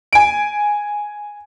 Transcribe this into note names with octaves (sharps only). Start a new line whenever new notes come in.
G#5 D7